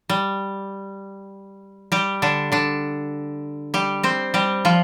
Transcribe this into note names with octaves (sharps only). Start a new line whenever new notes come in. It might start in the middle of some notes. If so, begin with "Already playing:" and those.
G3
G3 G4
D3 D4
D3 D4
G3 G4
C4 C5
G3 G4
F3 F4